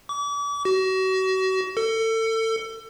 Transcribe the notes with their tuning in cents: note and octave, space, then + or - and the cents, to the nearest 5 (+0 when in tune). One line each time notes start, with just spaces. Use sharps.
D6 -40
F#4 +35
A4 +30